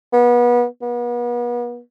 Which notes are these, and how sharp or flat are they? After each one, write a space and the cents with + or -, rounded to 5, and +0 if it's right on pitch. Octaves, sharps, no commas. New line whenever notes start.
B3 -30
B3 -40